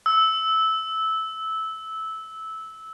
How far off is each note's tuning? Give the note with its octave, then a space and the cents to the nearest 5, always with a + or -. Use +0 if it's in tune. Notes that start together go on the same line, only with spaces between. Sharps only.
E6 -15